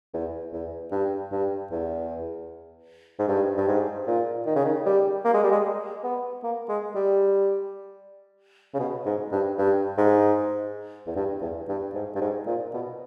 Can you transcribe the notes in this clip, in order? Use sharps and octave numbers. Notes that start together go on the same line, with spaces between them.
E2
E2
G2
G2
E2
G#2
G2
G2
G#2
A#2
D#3
C#3
D#3
G3
A#3
G#3
G3
G#3
B3
A#3
G#3
G3
C#3
B2
G#2
G2
G2
G#2
E2
G2
E2
G2
G#2
G2
G#2
A#2
B2